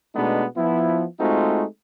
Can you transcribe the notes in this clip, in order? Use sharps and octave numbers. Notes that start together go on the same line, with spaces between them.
B2 G#3 A3 B3 D4 D#4
F3 B3 E4
G#3 A3 C4 D#4 F4 F#4